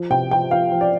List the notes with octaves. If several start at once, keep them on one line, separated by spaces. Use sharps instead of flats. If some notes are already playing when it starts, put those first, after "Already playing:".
Already playing: F3
C3 G5
F3 G5
F3 F5
F3
D5